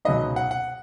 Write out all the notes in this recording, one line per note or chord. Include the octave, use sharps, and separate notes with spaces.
C#2 B2 F#3 B3 D#4 D#5
F#5
F#5